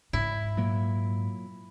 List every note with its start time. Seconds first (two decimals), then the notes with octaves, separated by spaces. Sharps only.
0.13 G#2 E4
0.57 A#2 F#3 A#3